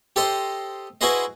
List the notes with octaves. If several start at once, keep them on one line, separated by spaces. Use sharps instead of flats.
G4 A4 C5 D#5
E4 F#4 G#4 B4 C5 D#5